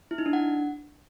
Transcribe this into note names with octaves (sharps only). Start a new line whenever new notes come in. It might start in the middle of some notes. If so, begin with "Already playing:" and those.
E4
D#4
D4
F#5